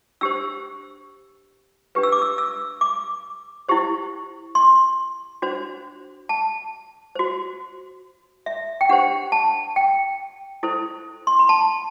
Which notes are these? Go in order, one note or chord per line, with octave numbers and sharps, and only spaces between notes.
D4 G4 C5 E6
D4 G4 B4
E6
D6
E6
E6
D6
E4 G4 C5
C6
D4 F#4 C5
A5
F#4 C5
E5
G5
D4 G4 C5 F#5
A5
G5
E4 A4 C5
C6
B5
A5